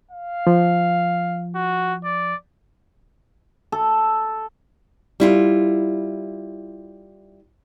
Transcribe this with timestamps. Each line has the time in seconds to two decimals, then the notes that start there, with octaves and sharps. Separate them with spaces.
0.11 F5
0.47 F3
1.55 F#4
2.04 D5
3.72 A4
5.20 G3 E4 F4